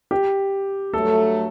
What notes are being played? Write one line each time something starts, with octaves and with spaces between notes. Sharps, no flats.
G4
G2 F#3 A3 A4